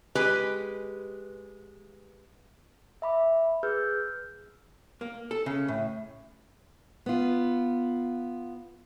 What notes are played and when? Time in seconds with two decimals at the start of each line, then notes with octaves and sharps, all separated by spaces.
0.15 G#3 G4 B4 G#5
3.02 E5 B5 D6
3.63 G#4 B4 E6 F6 G6
5.01 A#3
5.31 A4
5.46 C#3
5.68 A2
7.06 B3 F4